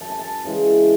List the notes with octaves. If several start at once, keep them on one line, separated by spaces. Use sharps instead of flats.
F#2 A5
G#5
A5
C#3 E3 G#3